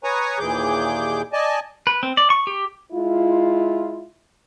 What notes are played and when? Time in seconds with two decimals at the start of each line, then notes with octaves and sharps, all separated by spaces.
0.04 B4 C#5 G#5 A#5 C#6 D#6
0.39 D#2 A#2 E3 G#4 D6 G6
1.33 D5 D#5 G#5 A5
1.87 B4
2.03 C4
2.17 D5
2.30 C#6
2.47 G4
2.92 G#3 E4 F4